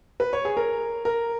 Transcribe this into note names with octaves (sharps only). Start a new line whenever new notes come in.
B4
C#5
G#4
A#4
A#4